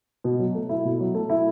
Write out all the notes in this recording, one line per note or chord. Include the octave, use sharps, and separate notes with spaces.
B2
F#3
A3
E4
B2
F#3
A3
E4